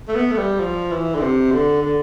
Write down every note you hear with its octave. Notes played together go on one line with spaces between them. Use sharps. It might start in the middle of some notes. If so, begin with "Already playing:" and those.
A3
B3
A3
G3
F3
E3
D3
C3
D3
D3